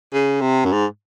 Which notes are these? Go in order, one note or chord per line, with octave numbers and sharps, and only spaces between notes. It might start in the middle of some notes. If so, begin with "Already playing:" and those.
C#3
C3
F#2
G#2